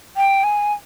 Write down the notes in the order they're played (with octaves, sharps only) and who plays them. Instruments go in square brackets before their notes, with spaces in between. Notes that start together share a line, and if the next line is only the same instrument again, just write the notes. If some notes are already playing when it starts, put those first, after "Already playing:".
[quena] G5
G#5